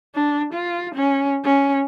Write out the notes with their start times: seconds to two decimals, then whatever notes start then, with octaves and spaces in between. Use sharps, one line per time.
0.15 D4
0.53 F4
0.95 C#4
1.44 C#4